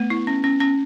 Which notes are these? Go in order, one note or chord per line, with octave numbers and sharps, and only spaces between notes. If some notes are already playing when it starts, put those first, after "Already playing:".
Already playing: A3 B3
E4
C#4
C#4
C#4